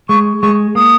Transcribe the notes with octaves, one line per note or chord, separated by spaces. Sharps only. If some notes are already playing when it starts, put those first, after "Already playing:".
G#3 C#6
G#3 C#6
A#3 D#6